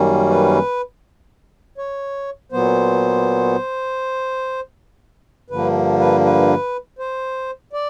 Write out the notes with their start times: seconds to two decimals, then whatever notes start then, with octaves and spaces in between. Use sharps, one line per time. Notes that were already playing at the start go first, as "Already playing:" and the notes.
Already playing: F#2 D#3 G3 A#3 C#4
0.29 B4
1.78 C#5
2.52 A#2 F#3 B3 C5
5.50 G2 D3 F3 A#3 B4
5.99 B4
6.25 B4
6.99 C5
7.73 D5